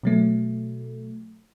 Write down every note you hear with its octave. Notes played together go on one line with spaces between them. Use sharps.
B2 F#3 A3